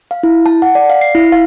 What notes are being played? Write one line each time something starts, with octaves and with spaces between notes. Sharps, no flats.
F5
E4
A5
F#5
D5
F5
C7
E4
F5